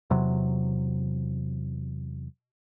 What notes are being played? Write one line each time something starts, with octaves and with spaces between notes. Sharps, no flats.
E2 C3 F#3